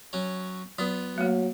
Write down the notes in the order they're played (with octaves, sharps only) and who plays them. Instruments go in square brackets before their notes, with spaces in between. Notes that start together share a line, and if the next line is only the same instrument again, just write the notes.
[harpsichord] F#3 C#4
[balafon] F#3 [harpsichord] B3 F4
[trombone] F#3 [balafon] A3 A#3